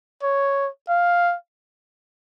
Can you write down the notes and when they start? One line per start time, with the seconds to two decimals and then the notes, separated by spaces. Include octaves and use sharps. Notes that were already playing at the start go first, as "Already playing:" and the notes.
0.23 C#5
0.89 F5